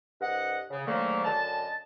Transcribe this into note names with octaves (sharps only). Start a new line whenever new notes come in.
C2 G2 D#5 F#5
C#3
G#2 D3 D#3 F#3 A3 A#3
F#2 D3 D#5 A5